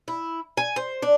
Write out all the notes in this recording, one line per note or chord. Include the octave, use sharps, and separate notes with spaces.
E4
G#5
C5
D4